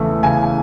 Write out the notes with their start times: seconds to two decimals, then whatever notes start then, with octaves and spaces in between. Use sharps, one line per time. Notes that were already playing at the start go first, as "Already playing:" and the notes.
Already playing: E2 C#3 E3 A3
0.23 C#3 G#5